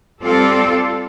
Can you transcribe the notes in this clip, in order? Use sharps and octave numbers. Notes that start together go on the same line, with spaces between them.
G3 C4 F4 A4 D5